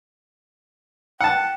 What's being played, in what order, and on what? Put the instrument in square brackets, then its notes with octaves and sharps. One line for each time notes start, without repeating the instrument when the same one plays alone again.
[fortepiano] F#5 A5 [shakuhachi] G5